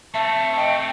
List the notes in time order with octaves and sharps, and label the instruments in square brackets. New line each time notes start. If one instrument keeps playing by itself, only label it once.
[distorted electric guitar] A3 C4 [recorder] E5 [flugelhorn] A5 [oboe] C#6
[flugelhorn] D#5 [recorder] G5